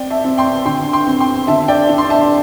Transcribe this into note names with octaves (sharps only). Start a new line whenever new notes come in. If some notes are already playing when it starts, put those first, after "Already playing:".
Already playing: C4 D5 G5
E5 A5
C4
G5 C6
D3 G5 C6
G5 C6
C4
G5 C6
D3 E5 A5
D5 G5
D4
C6
E5 A5